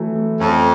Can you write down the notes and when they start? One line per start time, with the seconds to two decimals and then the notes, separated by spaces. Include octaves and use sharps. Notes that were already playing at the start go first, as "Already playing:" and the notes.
Already playing: E3 F#3 A3
0.15 A3
0.40 F2 C#4